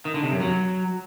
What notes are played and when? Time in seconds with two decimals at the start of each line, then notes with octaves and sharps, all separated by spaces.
0.05 D#3
0.14 D3
0.23 C3
0.32 F#2
0.41 F#3